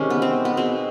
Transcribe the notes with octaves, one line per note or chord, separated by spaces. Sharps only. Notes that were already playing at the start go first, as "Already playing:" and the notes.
Already playing: C3 D#3 G#3 C#4
B3
C4
B3
B2 G#3 B3 C4